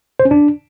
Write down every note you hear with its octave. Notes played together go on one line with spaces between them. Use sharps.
C5
C#4
D4